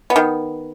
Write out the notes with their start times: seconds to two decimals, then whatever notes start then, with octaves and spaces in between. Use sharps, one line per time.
0.10 B3
0.16 D#3